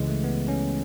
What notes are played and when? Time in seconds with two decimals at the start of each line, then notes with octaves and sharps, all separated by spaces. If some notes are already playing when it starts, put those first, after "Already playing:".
Already playing: C#2 C#3 E3 G#3
0.08 A3
0.24 B3
0.48 C#4